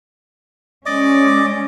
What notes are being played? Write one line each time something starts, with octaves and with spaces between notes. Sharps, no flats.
G#3 C#4 D5 D#5 D6